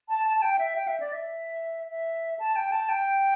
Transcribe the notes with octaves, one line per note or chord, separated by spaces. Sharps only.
A5
A5
A5
G5
E5
G5
E5
D5
E5
E5
A5
G5
A5
G5